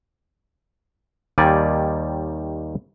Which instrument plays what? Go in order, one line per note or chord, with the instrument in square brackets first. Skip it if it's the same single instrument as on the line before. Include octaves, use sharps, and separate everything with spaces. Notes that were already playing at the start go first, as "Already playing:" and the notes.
[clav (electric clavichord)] D#2 D#3 G3 D5 G#5